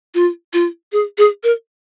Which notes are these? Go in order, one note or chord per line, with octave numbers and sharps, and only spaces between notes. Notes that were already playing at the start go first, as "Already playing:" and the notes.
F4
F4
G#4
G#4
A#4